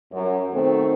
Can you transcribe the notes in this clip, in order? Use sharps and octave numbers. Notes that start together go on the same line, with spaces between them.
F#2
B2 D#3 A3 C4